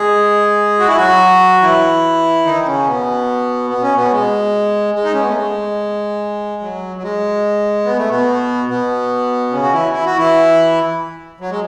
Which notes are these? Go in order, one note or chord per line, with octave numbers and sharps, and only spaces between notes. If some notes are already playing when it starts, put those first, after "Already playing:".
Already playing: G#3 G#4
F#4
E4
F#3 F#4
E3 E4
D#3 D#4
C#3 C#4
B2 B3
B3
C#4
B2 B3
G#3
G#3
D#4
C#4
B3
A3
G#3
F#3
F#3
G#3
B3
A3
B2 B3
B2 B3
C#3 C#4
F#4
E3 E4
E4
F#4
E3 E4
F#3
G#3